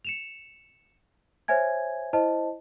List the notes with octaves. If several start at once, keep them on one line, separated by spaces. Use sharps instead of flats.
C#7 E7 F7
C5 C#5 E5 G#5 G#6
E4 C5 D#5 A5